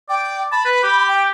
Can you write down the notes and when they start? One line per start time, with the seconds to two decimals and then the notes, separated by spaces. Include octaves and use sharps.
0.09 D5 G5
0.52 A5 B5
0.65 B4
0.83 G4
1.08 G5